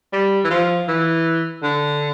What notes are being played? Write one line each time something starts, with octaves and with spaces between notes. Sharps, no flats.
G3
E3
F3
E3
D3